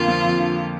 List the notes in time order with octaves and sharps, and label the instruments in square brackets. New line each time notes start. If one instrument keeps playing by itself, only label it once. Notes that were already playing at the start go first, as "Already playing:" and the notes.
Already playing: [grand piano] F2 D3 A#3 [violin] F4
[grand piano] F3
F2
D3